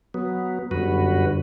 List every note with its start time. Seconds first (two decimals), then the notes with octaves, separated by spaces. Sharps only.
0.14 F#3 B3
0.71 G1 F#2 F#4 B4